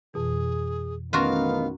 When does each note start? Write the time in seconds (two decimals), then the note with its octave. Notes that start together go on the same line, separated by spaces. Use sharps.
0.14 F2 B2 E3 G#4
1.13 A1 D#3 B3 C#4 F4 F#4 A#4 F5